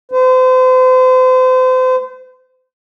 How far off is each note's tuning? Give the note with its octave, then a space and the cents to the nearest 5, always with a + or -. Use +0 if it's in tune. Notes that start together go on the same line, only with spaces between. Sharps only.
C5 -35